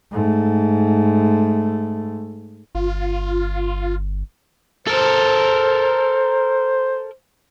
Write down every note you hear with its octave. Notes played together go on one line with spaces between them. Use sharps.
G#2 A3
G1 F4
A4 A#4 C5